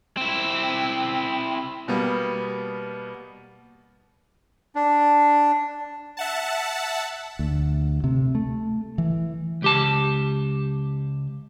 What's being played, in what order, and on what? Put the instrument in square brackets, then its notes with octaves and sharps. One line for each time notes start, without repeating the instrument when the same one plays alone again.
[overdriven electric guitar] C4 E4
[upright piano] B2 G3 A#3 B3
[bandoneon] D4
[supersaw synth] E5 F#5 A5
[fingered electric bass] D2
C3
A3
E3
[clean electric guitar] C#2 G4 A5